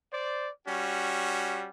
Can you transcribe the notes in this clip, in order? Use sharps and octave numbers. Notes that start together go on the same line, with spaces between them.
C5 D5
G3 C#4 F#4